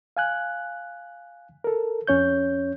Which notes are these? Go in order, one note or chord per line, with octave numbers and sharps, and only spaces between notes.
F5 G#5 F#6
A4 A#4
F2 C#4 C#5 G6